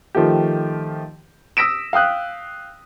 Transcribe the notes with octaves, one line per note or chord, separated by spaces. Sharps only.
D#3 F3 A3 G4
D#6 E6 A#6 B6 D7 E7
F5 G5 D#6 F#6